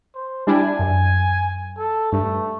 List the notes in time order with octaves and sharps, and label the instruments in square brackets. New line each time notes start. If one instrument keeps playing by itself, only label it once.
[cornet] C5
[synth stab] G3 D4 E4 [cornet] G#5
[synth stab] F#2
[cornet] A4
[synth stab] G2 [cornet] A3